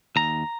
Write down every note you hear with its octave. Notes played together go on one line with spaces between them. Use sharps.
D#2 A#5